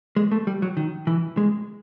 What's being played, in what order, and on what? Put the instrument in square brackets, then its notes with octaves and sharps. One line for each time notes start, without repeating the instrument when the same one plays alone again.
[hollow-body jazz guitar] G#3
A3
G3
F#3
D#3
E3
G#3